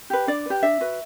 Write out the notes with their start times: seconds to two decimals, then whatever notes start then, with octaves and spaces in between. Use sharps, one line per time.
0.10 G4 B4
0.27 D4 D5
0.46 G4 B4
0.63 D4 E5
0.81 F#4 B4